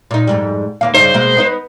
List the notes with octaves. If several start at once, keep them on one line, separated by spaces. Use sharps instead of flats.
A#2 D#4
F2 G#2 G3
D#2 A#3 F5
G2 C#3 D#4 C5
B2 G#3 A#3
B3 D#4 B4